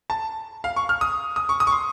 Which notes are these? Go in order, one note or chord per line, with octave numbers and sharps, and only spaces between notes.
A5
F5
C#6
F6
D#6
D#6
C#6
D#6
C#6
C6